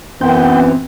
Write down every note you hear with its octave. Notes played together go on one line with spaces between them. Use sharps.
F#2 E3 B3 C4 G5